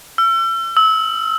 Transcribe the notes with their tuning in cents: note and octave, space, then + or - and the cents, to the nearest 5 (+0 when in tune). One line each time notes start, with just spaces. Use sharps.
E6 +40
E6 -25